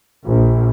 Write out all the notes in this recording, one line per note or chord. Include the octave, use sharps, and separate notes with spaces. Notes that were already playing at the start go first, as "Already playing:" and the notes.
A#1